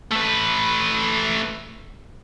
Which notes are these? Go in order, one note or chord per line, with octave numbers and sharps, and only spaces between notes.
A3 B4